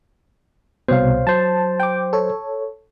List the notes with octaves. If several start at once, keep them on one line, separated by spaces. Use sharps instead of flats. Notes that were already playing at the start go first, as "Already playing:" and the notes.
C2 B2 C5 C#5 F5
F#3 C5 A5
G5 D6
A4 C#5